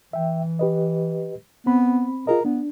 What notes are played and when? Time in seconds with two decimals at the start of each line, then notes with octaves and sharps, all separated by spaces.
0.13 E3 E5 G5
0.59 G4 B4 D#5
1.66 B3 C4 B5
2.27 F4 G#4 A#4 D#5
2.45 B3 D4